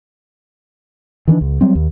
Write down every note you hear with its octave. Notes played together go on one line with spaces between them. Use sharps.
D#3 E3 G#3 D4
C#2
F#3 G3 C4
D#2